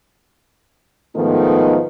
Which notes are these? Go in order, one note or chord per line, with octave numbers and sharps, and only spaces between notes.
G#2 D#3 F3 A3 B3 D#4